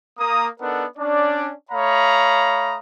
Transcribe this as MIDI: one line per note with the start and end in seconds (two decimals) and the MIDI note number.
0.19 0.47 58
0.19 0.47 82
0.19 0.47 87
0.60 0.85 59
0.60 0.85 62
0.60 0.85 63
0.60 0.85 69
0.60 0.85 70
0.60 0.85 78
0.98 1.52 61
0.98 1.52 62
0.98 1.52 74
1.71 2.78 57
1.71 2.78 73
1.71 2.78 77
1.71 2.78 82
1.71 2.78 83
1.71 2.78 87